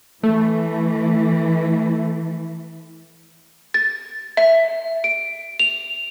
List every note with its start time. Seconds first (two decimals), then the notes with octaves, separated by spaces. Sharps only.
0.23 E3 A3
3.74 A6
4.37 E5
5.04 D7
5.60 F7